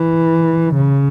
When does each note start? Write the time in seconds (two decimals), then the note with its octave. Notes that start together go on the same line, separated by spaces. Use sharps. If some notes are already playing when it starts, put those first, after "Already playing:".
Already playing: E3
0.75 C#3